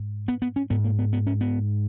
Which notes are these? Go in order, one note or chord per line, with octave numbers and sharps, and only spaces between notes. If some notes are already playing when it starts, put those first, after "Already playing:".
Already playing: G#2
B3
B3
C#4
G#2 B3
A#3
B3
B3
C#4
B3